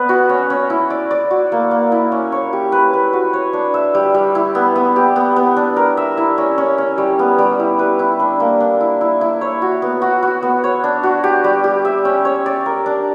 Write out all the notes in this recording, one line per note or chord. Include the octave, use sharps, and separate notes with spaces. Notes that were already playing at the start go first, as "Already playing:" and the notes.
Already playing: B3 B4 D5
F#4
C#4
C#4
E4
D5
D5
F#4
A#3
A#3
E4
C#4
C#5
G4
B4
B4
F#4
C#5
D4
E5
G3
G3
E4
B3
B3
G4
B3
B3
D4
A#4
E5
E4
C#4
C#4
C#4
G3
B3
G3
E4
B4
E4
D4
A#3
D4
E4
E4
E4
C#5
F#4
B3
F#4
F#4
B3
C#5
D4
F#4
G4
G3
G4
E5
C#4
C#5
D5
A#4
D4